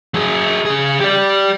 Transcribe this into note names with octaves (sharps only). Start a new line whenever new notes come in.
F#3 G#4
C#3 G#4
G4 D5